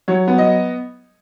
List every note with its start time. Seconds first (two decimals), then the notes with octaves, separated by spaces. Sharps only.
0.08 F#3 C#5
0.28 B3
0.38 D#5